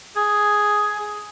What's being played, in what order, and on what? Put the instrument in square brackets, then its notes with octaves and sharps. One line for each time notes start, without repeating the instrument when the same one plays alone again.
[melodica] G#4